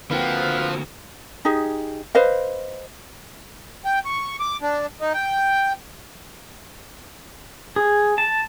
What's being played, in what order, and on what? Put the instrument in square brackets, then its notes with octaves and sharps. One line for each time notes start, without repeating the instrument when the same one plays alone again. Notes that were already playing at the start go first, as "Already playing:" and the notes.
[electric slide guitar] D3 F#4 [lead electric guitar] F3 [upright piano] A#3 C4 G5 [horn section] B4 F5
[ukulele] D#4 G4 G#4
B4 C5 D#5 F5
[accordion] G5
C#6
D6
D4
D#4
G5
[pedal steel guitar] G#4
A5